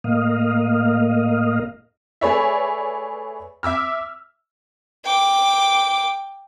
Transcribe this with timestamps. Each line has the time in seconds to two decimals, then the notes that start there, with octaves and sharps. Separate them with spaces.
0.04 A2 A#3 D#5 F5
2.21 A3 G#4 B4 C#5 D5 E5
3.63 E5 D6 E6 F6
5.05 G5 D6